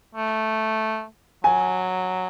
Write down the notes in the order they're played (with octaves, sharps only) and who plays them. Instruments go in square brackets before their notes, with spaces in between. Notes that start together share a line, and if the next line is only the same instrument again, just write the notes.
[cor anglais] A3
[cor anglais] F#3 [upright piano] G#5